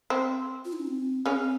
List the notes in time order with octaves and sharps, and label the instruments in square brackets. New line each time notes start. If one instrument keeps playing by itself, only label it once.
[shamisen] C4
[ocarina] F4
D#4
C#4
C4
[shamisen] C#3 C#4 [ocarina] C4